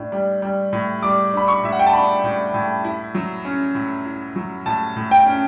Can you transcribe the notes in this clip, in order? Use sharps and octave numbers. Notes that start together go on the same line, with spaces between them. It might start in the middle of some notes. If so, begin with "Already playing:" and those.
Already playing: A2 D4
G3
G3
A2
G3 D6
D4 B5
C#6
A2 E5
F#5
G5
A5
D4 B5
A2
A2
E4
F#3
C#4
A2
E4
F#3
A2 A5
A2
G5
C#4